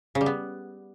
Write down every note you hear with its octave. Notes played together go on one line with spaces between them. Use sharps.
C#3
G3
B3